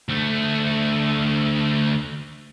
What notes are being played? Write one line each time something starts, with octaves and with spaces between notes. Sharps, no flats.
D2 A3